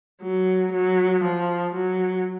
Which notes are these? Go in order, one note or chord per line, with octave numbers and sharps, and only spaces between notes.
F#3
F#3
F3
F#3